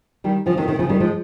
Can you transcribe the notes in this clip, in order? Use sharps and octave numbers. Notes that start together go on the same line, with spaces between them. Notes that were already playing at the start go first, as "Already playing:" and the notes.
D#3 G3
C#3 F3
C3 D#3
C3 D#3
C#3 F3
D#3 G3
F3 G#3